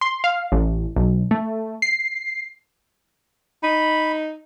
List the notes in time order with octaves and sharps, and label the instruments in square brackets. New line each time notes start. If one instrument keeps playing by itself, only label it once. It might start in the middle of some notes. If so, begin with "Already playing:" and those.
[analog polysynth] C6
F5
A1
B1
A3
C7
[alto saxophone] D#4 [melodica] B5